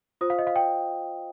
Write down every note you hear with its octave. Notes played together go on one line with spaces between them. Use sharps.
F4 C5 D#6
F5
D#5
F5
G5